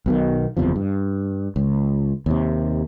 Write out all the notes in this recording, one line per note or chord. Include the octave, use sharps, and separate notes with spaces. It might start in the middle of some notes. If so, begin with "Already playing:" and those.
B1 B2 D#3
F#1 E2 C3 F3
G2
C#2
D#2 C3